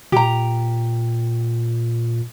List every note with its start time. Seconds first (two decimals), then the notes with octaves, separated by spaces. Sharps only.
0.12 A#2 G4 A#5